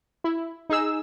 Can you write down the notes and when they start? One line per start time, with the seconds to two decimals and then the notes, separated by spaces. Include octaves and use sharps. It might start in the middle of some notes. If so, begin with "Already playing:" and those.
0.24 E4
0.70 D#4 G#4 E6